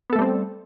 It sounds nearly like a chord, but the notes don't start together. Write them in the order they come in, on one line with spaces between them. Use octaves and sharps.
B3 A4 A3 G3 C4